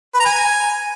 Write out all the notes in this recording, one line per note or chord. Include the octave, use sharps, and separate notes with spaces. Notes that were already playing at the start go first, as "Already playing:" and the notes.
B4
A#5
G#5